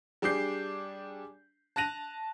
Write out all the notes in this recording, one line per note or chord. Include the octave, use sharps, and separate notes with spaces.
G3 D4 G#4 D6 G6 C7
A5 F#6 A#6 D#7 F7